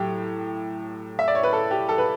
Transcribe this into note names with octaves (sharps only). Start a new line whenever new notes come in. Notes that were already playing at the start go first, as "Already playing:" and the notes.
Already playing: A2 F#3 G4
E5
D5
C#5
B4
A4
G4
A4
B4